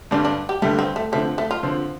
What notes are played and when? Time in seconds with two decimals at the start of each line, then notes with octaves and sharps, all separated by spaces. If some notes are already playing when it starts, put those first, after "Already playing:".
0.11 G2 D3 G3 D4
0.25 D4
0.49 G4
0.62 G2 D3 G3 A3
0.79 C4
0.96 A3
1.12 D3 F3 A3 C4
1.38 A3
1.51 F4
1.63 D3 F3 C4